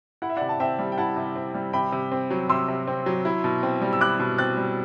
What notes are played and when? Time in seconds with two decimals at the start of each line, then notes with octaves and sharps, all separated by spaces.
0.22 E4 F#5
0.30 E5
0.37 C3 D5 F#5
0.49 A5
0.60 C4 E5 G5
0.79 G3
0.92 G5
0.98 E4 F#5 A5
1.16 C3
1.36 C4
1.54 G3
1.73 C3 G5 B5
1.92 C3
2.12 C4
2.31 F#3
2.49 C3 C6 E6
2.68 C3
2.87 C4
3.06 F#3
3.25 E4
3.44 B2
3.63 C4
3.81 G3
3.93 E6
4.01 E4 D6 F#6
4.19 B2
4.38 C4 F#6 A6
4.57 G3